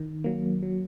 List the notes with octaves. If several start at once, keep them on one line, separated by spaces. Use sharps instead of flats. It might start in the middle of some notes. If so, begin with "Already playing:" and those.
Already playing: D#3
F#3 A#3
F#3